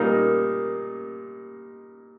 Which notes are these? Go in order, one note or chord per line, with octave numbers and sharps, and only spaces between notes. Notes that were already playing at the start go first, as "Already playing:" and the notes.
Already playing: A#2 G3 A#3 D#4 A#4